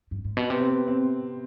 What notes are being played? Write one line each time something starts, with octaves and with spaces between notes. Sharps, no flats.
G2
G#2
B2
C3 B3
C4
B3
C4